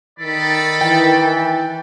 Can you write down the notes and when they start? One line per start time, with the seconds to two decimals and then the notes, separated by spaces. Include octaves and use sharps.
0.20 D#3 A4 D5 B5
0.81 E3 G5